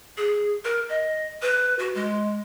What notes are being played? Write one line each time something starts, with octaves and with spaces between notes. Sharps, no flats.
G#4
A#4
D#5
B4
F#4
G#3